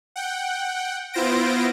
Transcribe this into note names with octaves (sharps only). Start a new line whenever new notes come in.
F#5 G5
B3 E4 F4 C5 A#6 D7